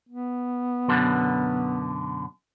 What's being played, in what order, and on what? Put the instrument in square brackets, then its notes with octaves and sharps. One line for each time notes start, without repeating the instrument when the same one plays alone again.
[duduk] B3
[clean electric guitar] F#2 B2 D3